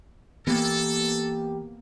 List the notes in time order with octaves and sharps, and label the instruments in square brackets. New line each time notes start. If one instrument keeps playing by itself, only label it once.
[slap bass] E3 [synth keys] A#3 B3 [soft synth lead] G4 [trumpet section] A4